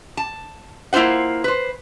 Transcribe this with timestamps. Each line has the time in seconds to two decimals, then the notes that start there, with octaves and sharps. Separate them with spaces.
0.17 A5
0.93 A#3 E4 F4 C5 F#5
1.44 B4 C5